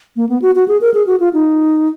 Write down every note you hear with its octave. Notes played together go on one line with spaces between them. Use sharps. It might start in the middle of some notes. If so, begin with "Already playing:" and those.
A#3
B3
F#4
F#4
G#4
A#4
G#4
F#4
F4
D#4